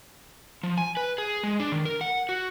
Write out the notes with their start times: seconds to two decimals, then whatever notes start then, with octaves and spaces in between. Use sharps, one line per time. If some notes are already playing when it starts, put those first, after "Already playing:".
0.63 F3
0.78 G#5
0.97 B4
1.18 G#4
1.44 G#3
1.60 D4
1.72 D#3
1.85 A#4
2.01 F#5
2.29 F#4